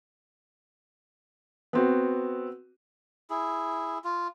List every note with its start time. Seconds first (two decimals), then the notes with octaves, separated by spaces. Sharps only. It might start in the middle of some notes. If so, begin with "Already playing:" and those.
1.73 B3 C4 F#4
3.30 E4 G#4
4.04 F4